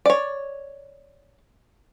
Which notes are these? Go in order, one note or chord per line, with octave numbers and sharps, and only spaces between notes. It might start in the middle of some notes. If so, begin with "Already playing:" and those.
C#5 D5